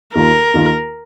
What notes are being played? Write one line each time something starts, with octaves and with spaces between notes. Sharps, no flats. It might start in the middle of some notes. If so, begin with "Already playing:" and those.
D#2 D#3 A#3 F4 A#4
D#2 D#3 A#3 F4